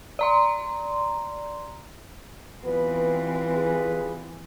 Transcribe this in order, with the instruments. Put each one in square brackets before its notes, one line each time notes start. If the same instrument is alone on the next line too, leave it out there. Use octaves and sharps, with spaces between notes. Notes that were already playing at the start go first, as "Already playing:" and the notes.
[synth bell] D5 A#5 C6
[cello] E3 C4 [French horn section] G3 F4 B4 [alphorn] B3
[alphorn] G#4